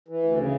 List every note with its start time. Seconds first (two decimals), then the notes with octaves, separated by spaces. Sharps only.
0.08 E3
0.23 D2
0.37 C#3